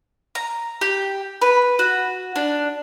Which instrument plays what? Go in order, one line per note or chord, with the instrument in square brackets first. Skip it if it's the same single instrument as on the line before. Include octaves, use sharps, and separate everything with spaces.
[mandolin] A#5
G4
B4
F#4
D4